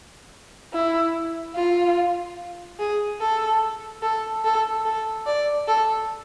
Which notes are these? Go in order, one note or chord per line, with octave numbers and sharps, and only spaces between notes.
E4
F4
G#4
A4
A4
A4
A4
D5
A4